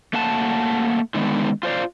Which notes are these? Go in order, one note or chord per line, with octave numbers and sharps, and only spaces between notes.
A3 A#3 F#5 A5
D3 D#3 G#3 A#3 B3
F4 C5 D5 F5